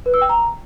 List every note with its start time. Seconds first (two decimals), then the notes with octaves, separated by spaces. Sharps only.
0.06 B4
0.14 E6
0.22 G5
0.29 A#5